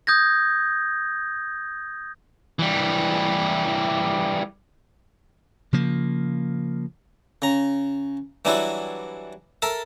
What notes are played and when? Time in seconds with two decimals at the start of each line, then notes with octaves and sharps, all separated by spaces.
0.07 D#6 G6 G#6 A#6
2.59 E3 G3
5.73 C#3 F3 A#3
7.42 C#3 A#5
8.45 E3 F#3 G3 D4 E4 F#4
9.62 A4 A#4 E5 A5